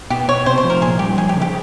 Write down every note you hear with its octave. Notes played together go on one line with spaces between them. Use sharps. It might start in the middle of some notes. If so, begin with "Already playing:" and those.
B2 G4
B2 C#5
C3 C5
C5
F3
A#4
A#2 G#4
G3 G4
F3 G#4
G4
C#3
G4